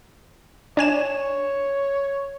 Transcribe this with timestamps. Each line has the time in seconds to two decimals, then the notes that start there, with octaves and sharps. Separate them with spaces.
0.77 D4 C#5 G#5 E7